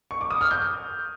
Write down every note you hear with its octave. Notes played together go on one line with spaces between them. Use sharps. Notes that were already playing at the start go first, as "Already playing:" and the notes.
C#6
D6
D#6
F6
G6